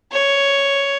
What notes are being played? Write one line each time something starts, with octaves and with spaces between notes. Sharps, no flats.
C#5